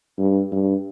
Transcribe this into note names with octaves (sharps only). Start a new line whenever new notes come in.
G2
G2